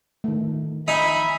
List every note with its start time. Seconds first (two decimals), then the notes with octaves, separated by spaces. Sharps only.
0.24 D#3 A3
0.88 D#4 E5 G#5 B5